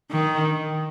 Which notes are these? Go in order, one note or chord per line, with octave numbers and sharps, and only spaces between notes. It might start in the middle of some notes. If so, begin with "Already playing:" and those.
D#3